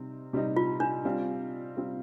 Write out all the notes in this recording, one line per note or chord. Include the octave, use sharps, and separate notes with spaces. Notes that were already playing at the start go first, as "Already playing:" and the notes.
Already playing: C3 G3 C4 D#4
C3 G3 C4 D#4
F4
D4
G3 C4 F4
G3 C4 F4